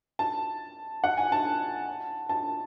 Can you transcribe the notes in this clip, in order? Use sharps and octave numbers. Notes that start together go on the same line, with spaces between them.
A5
F#5
G#5
A5
A5